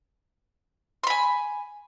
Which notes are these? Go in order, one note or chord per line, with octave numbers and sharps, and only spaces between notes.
G#5 B5 C6